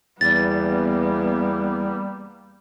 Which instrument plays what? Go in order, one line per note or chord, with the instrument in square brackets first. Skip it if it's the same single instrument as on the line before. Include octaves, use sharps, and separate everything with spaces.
[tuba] E2 [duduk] G3 [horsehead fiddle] A#3 B3 [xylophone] A6